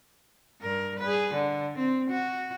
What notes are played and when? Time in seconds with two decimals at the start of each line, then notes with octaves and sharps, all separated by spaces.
0.62 G2 A#4
1.00 G#4 B4
1.34 D3
1.78 C4
2.10 F#4